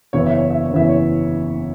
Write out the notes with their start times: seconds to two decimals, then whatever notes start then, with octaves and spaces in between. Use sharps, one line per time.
0.13 F#1 E2 E3 C#4 E4 C#5
0.26 E5
0.38 C#5
0.51 E5
0.64 C#5
0.72 F#1 E2 E3 C#4 E4 E5
0.89 C#5